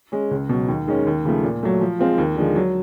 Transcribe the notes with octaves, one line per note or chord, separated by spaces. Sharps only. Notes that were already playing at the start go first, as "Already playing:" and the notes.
G#3 C#4
C#2
B2 F#3
D#2
D#3 G#3 C#4
D#2
C#3 F3 A3
A#2
F#3 A3
F3
G#3 C4 F4
D#2
D3 F3 G#3
F#3